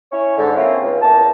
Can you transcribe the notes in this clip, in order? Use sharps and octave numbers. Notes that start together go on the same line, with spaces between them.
C#4 E4 C#5
G#2 D3
A#3 C4 C#4 E4 F4
C#2
E2 A#3 A5